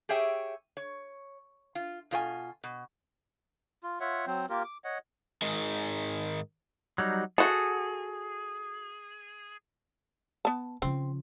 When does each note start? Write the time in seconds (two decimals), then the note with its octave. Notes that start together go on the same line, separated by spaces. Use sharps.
0.09 G4 G#4 C#5 E5 G5
0.77 C#5
1.75 F4
2.11 B2 F4 C5 G#5
2.64 B2
3.83 F4
4.00 F4 C#5 E5 F#5
4.26 F#3 C4 C5
4.50 A#3 F4 G4 A#4
4.64 D6
4.84 C#5 D#5 F#5
5.42 G#2 D#3 G#3
6.98 F#3 G3 D#4
7.38 F#4 G#4 A4
10.45 B3 A5
10.82 C#3 F3 C4